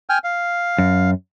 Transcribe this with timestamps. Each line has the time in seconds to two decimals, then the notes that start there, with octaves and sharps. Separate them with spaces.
0.10 G5 G#5 F6
0.24 F5
0.78 F#2